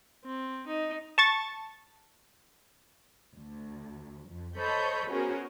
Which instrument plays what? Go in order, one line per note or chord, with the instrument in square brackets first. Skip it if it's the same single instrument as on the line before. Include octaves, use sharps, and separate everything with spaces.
[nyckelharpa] C4
D#4
[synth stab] A5 C#6 A6
[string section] D2
F2
A4 C5 C#5 D#5 B5 G6
B3 C#4 F#4 G#4 A#4 C5